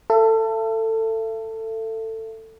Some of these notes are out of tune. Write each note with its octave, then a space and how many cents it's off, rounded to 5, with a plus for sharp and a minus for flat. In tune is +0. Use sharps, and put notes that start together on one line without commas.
A4 +20 E5 +40